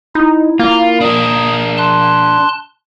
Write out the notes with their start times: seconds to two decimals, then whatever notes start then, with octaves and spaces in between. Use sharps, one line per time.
0.15 D#4 E4
0.60 A#3 F4
1.01 D4 A#4 D#6
1.78 A5 C6 F#6